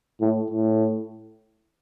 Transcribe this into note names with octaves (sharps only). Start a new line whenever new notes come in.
A2
A2